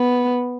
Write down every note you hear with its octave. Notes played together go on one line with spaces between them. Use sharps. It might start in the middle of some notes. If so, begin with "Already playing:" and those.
Already playing: B3